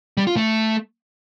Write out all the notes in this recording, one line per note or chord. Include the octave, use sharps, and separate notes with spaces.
G3
F4
A3